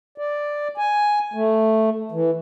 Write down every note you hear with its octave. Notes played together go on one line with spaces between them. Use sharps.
D5
G#5
A3
E3